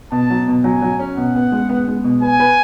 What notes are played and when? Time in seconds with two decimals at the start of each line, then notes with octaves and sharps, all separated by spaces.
0.12 B2 A5
0.30 F#3
0.48 B2
0.64 F#3 G#5
0.82 F#3
0.99 C#4
1.17 B2 F#5
1.35 B3
1.52 G#3
1.69 B3
1.88 G#3
2.04 B2
2.22 B4 G#5
2.40 B4